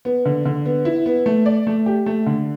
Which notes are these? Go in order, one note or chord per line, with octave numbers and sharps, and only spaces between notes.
B3
D3
D3
B3
E4
B3
A3
D5
A3
G4
A3
D3